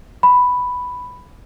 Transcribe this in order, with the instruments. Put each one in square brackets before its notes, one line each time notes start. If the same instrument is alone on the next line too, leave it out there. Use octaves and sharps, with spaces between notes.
[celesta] B5